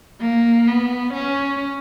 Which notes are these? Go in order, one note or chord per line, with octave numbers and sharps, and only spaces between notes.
A#3
B3
C#4